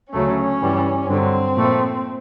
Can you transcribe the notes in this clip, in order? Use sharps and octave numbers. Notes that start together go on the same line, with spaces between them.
D2 C#3 F#3 A3 C#4
G2 E3 G3
G2 D3 F#3 C4
A#2 F3 A3